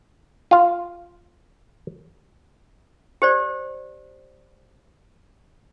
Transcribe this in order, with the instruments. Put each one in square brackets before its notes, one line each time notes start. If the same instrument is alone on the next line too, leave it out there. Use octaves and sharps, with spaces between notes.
[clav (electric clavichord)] F4 F5
[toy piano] G4 C5 D5